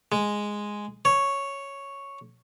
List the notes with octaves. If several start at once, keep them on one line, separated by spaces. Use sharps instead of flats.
G#3
C#5